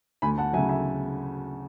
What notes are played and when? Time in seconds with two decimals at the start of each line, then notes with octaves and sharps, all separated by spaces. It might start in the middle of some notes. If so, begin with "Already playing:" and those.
0.22 D2 G#5 B5
0.38 F#5 A5
0.53 F#3 E5 G#5
0.58 C#3
0.69 E5 G#5